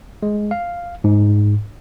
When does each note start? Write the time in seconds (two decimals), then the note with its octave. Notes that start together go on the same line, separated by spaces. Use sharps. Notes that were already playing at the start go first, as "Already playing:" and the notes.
0.23 G#3
0.51 F5
1.04 G#2